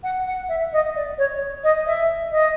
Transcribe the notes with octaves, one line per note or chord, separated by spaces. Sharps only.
F#5
F#5
E5
D#5
D5
C#5
D#5
E5
D#5